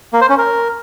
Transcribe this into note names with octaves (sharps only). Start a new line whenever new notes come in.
A#3
C5
C#4
A#4